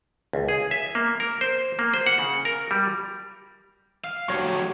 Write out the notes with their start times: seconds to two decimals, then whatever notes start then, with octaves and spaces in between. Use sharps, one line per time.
0.33 C#2
0.48 G#4
0.71 E5
0.95 A#3
1.20 A#4
1.41 C5
1.79 A#3
1.94 C5
2.06 F#5
2.19 C#3
2.45 A#4
2.71 G3
4.04 F5
4.28 F#3 A3 G4 C#5 C#6